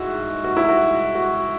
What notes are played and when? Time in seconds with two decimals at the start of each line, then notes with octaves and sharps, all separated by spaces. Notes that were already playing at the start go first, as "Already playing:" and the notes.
Already playing: G#2 E4 F#4
0.44 F#4
0.57 E4
0.69 F#4
1.15 F#4